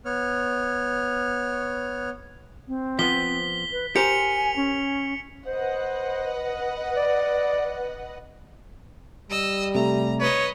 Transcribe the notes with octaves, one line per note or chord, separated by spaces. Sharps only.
B3 C#5 F6
C4
F3 B3 B6 G7
B4
G4 A#4 C5 G#5 C#7 F7
C#4
B4 C5 D#5 F#5
D5
G3 D#5 E6
C3 A3 A#5
B4 C#5 D#5